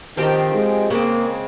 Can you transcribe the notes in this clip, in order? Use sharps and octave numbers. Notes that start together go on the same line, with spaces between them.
D#3 F3 C4 G4
G#3
C#3 G#3 A#3 C4